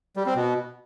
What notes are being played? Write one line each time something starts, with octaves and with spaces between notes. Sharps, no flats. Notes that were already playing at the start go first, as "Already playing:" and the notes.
G3
C4
B2